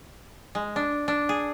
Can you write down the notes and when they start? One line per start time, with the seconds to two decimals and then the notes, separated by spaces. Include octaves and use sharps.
0.55 G#3
0.76 D4
1.08 D4
1.29 G#4